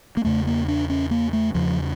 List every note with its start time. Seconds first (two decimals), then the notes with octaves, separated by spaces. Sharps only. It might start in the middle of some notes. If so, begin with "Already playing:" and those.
0.17 A#3
0.25 E2 C#3 A3
0.47 A#3
0.68 D4
0.90 C#4
1.11 A#3
1.33 A3
1.54 E2 C#3 F3